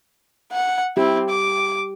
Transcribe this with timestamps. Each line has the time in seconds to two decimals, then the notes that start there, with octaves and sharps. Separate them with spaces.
0.52 F#5
0.97 C4 E4 G4
1.29 D6